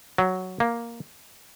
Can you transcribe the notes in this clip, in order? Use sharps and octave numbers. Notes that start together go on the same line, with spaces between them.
F#3
A#3